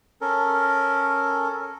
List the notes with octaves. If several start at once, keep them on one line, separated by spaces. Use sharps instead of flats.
C#4 A4 A#4